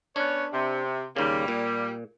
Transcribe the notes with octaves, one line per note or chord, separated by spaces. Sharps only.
B3 C#4 D4 C#5
C3
D#2 C#3 G3 A#3
A#2